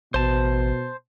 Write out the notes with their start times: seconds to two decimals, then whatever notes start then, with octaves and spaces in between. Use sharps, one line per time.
0.14 A1 B2 C5 A5